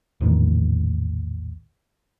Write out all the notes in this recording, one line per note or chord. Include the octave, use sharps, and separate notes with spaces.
A#1 E2 A2 D#3